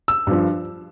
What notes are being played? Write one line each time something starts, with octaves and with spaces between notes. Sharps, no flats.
E6
G2 F3